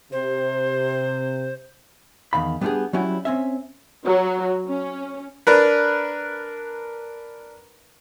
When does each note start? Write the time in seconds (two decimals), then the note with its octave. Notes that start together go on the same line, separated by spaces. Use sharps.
0.12 C3 C5
2.33 E2 D#3 F5 B5
2.61 G3 B3 D4 F4 G4 G#4
2.93 F#3 G3 C#4 E4 F#4
3.25 C4 C#4 E5
4.05 F#3
4.67 C#4
5.47 D4 A#4 B4